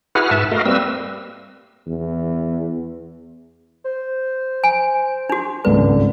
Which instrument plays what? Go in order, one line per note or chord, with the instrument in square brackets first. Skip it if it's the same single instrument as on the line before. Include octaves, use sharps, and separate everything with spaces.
[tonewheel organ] E4 F#4 G#4 B4 F#5 F6
G#2 B4 E5 A5
A3 F#4 A#4 D#5 F5
G3 A#3 C4 B4 E6
[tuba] E2
[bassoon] C5
[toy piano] G#5
D4 F#4
[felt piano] G#1 C#2 G2 [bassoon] D3 [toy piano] B4